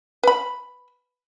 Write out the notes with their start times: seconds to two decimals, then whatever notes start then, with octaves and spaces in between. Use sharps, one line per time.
0.23 B4 B5